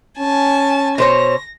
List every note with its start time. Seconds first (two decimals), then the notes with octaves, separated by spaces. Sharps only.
0.19 C#4 G#5 A5
0.98 B2 C5 C#5 A#6